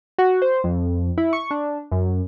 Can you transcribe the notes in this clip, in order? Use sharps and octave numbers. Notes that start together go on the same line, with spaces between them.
F#4
C5
F2
E4
C#6
D4
F#2